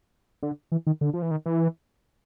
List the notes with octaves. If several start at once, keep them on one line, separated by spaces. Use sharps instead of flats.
D3
E3
D#3
D3
F3
E3
D#3
E3